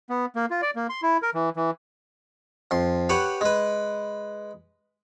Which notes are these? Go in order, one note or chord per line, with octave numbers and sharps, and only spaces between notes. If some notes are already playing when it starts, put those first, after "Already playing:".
B3
A#3
F4
D5
A#3
C6
E4
A#4
E3
E3
F2 C6
G4 B4 C#5 F#5
G#3 B4